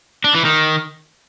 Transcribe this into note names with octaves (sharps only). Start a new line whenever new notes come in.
D4
E3
D#3